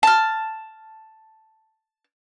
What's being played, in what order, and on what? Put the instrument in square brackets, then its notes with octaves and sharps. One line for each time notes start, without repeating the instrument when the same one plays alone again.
[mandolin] A5 F6